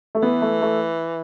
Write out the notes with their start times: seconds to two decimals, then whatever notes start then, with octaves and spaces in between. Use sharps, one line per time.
0.15 A3
0.22 E3 B3
0.42 A3
0.62 A3